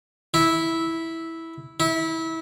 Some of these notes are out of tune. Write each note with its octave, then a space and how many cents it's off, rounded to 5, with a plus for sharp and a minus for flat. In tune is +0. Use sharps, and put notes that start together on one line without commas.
E4 -10
E4 -25